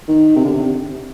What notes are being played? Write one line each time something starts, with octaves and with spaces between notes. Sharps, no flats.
D#3
C3
D3
C3